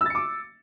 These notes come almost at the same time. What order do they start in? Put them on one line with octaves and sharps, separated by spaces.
E6 A6 C#7 D6